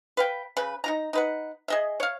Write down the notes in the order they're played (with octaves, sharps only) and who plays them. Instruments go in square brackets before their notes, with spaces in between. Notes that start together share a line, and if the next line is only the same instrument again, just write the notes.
[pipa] B4 F5 G5
C#3 B4
D#4 F4 A#5
D#4 B4 F#5
G#4 D#5 E5
C#5 F5